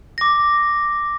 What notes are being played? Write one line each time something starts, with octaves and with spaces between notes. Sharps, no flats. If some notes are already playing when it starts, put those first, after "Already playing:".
D6 A#6